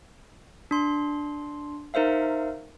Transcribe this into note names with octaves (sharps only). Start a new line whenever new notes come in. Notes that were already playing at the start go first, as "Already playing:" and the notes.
D4 C6
D#4 A#4 C5 E5 F5